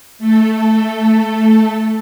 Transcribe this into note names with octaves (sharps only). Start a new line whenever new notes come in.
A3 A4